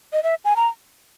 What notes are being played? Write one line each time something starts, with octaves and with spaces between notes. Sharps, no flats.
D#5
E5
G#5
A#5